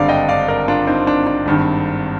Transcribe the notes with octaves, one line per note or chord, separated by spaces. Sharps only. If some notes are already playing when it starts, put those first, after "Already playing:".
Already playing: G#1 G2 D3 D5 F5
D#5 G5
D5 F5
A#4 D5
D4 F4
C4 D#4
D4
D4
G#1 G2 D#3